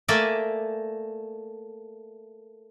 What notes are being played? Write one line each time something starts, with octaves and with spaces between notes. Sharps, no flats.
A3 A#3 A#4 D5 E5 G#5